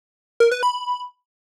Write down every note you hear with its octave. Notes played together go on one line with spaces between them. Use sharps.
A#4
B4
B5